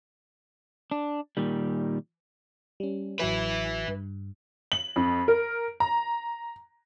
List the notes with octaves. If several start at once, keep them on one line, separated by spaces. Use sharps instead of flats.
D4
A#2 D#3 G3
G3 C#4
A1 F#3 B4 E5 B6
G2
F#7
F2
A#4
A#5